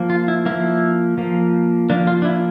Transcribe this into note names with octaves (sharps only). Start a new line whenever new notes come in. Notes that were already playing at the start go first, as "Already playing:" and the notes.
Already playing: F3 A#3
F4
E4
F3 A#3 E4
F3 A#3
F3 A#3 D4
F4
D4
E4